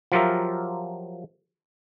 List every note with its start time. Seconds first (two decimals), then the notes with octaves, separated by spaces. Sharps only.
0.12 F3 F#3 F4 G4 A#4 E5